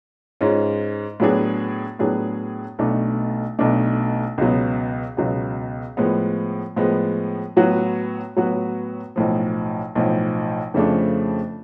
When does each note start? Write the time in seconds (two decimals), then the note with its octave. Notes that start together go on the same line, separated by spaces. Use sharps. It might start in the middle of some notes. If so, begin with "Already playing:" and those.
0.41 G#2 G#3 C#4 F4
1.20 A2 F#3 B3 D4 G#4
1.99 A2 F#3 B3 D4 G#4
2.79 B1 B2 A3 D4
3.59 B1 B2 A3 D4
4.38 C#2 B2 F#3 B3
5.17 C#2 B2 F#3 B3
5.97 A2 F3 G#3 B3
6.76 A2 F3 G#3 B3
7.57 A2 F#3 B3 F#4 B4
8.37 A2 F#3 B3 F#4 B4
9.16 B1 A2 F3
9.95 B1 A2 F3
10.74 F2 C#3 F3 A3 D4